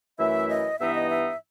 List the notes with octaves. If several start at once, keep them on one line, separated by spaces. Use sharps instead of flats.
F#2 E3 A3 E4 E5
D#5
G2 E3 B3 D#4 E5
D#5
E5